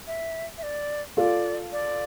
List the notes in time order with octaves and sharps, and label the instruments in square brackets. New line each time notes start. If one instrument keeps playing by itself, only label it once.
[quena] E5
E5
D5
[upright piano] F4 A4 [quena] D5
[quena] D5